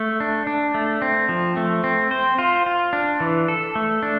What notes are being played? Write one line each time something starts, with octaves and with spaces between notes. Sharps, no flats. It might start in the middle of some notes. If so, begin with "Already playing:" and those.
Already playing: A3
D4
D4
A3
C4
F3
A3
C4
C5
F4
F4
D4
E3
A4
A3
D4